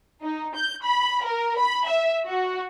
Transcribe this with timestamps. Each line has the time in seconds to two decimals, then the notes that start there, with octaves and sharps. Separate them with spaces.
0.22 D#4
0.55 G6
0.84 B5
1.22 A#4
1.57 B5
1.87 E5
2.27 F#4